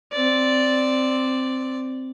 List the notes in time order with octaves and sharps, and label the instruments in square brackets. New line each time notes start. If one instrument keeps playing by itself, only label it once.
[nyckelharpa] C4 D5